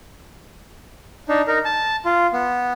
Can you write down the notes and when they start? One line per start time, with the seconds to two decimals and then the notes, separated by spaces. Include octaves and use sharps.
1.29 D4 D#4
1.48 D#4 A#4
1.65 A5
2.05 F4
2.33 B3